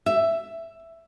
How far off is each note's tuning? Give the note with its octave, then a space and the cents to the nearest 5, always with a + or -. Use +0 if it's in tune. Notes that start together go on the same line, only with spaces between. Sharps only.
E5 +10